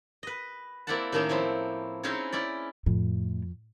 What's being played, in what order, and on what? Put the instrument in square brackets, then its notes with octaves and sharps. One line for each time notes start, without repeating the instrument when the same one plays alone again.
[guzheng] B4 D#5
A#3 C4 E4 D5 F#5 A5
A2 D#3 A3 A#3 C#4 D#4
F3 C4 E4 C#5
C4 C#4 D#4 E4 G#4 C#5
C#4 E4 D5
[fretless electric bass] F2 [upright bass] A2